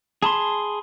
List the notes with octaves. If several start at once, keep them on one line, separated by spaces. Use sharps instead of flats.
G#4 A5 B5 C6